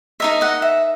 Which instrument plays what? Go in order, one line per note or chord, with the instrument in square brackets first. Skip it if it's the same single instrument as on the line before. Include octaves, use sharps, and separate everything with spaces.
[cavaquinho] D#4 A#4 D#5 E5
D#5 F#5
E5